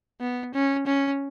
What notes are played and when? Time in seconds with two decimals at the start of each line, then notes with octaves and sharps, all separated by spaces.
0.21 B3
0.54 C#4
0.87 C#4